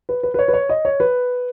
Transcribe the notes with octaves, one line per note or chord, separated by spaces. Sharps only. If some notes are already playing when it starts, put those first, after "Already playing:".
B4
B4
B4
C#5
B4
C#5
D#5
C#5
B4